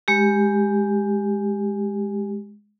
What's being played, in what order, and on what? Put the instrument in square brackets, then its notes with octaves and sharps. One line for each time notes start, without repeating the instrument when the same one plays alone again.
[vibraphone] G#3 G4